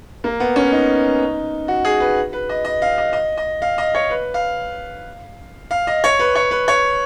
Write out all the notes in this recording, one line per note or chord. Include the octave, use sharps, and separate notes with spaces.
A#3
B3
C#4
D#4
F#4
G#4
B4
B4
D#5
D#5
F5
D#5
D#5
D#5
F5
D#5
C#5
B4
F5
F5
D#5
C#5
B4
C#5
B4
C#5